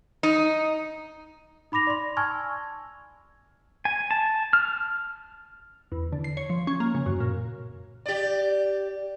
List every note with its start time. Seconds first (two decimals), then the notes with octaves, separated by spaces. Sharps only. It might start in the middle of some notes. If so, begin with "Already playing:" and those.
0.23 D#4
1.72 D#4 B5 D6 A#6 F7
1.87 D5 C6
2.17 G#5 A5 C#6 E6 F6 G#6
3.85 G#5
4.11 A5
4.53 F6
5.92 E2
6.12 D3
6.24 C7
6.37 C#5
6.50 F3
6.67 C#4
6.80 A#3
6.95 C#3
7.06 F#2
7.20 A#2
8.06 G4 D5